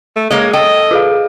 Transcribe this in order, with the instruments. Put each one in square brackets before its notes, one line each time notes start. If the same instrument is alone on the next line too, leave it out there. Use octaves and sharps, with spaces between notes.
[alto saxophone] A3
[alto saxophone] G#3 [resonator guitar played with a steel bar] A#3 C#5 D#5
[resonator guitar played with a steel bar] A4 G5 [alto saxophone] D#5
[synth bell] F4 G#4 F5